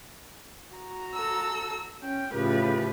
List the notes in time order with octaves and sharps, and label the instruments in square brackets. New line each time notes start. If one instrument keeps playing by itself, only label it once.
[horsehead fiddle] F#4 A#5
[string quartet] A4 E6
[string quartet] C#4 [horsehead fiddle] G5
[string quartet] A2 C#3 F3 [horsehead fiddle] G4 B4